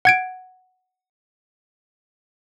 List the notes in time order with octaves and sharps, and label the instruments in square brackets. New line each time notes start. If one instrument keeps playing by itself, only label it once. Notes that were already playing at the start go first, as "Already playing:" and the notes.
[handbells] F#5 G#6 D7